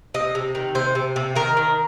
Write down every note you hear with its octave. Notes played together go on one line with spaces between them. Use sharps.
C3 D#5
C3
D#3
C3 C5
C3
C3
D#3 A#4
D#3